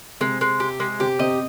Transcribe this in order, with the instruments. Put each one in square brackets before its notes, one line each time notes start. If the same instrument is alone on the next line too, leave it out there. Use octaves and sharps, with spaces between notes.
[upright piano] C3 C4 [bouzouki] G#3
[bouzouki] G#3
G4
G#3
[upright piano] C3 C4 [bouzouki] G4
[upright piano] C3 C4 [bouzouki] D#5